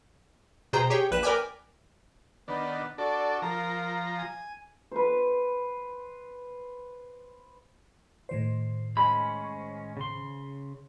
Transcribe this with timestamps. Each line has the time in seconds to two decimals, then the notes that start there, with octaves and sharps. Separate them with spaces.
0.73 B2 G#4 C5 G5 A#5
0.90 G4 G#4 C#5 G5
1.11 A#1 B4 F#6 E7
1.23 A#4 B4 D5 G5 G#5 D6
2.48 D#3 B3 D4 B4
2.98 D4 F#4 A4 D5
3.42 F3 A#4 A#5
4.18 G#5
4.92 B4 C5
8.29 A2 D#3 C5
8.97 G#3 C#4 B5
9.97 C#3 C6